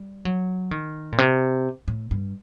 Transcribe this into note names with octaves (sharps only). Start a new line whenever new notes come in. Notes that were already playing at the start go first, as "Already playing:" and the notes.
Already playing: G3
F#3
D#3
A#2
C3
A2
G2